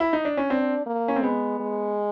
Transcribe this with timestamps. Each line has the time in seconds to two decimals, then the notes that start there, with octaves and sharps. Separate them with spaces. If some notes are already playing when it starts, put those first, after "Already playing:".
0.00 E4
0.13 D#4
0.25 D4
0.37 C#4
0.50 C4 D4
0.86 A#3
1.08 C#4
1.16 C4
1.23 G#3 B3
1.60 G#3